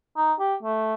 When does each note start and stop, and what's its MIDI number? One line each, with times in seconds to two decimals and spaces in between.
0.17 0.33 63
0.40 0.55 67
0.63 0.94 57